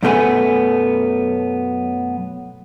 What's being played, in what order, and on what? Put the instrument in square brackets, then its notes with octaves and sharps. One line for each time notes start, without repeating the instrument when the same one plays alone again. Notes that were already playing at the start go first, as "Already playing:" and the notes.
[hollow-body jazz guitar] F#2 B2 A3 B3 G#5